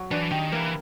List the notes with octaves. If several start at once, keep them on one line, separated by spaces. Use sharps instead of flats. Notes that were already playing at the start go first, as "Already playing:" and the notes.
Already playing: F#3
E3 D4
D#3 G4
E3 A#3